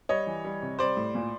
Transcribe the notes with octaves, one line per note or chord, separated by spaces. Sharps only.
G3 C#5 D#5
E3
G3
C3
G3 C5 D5
A2
A#2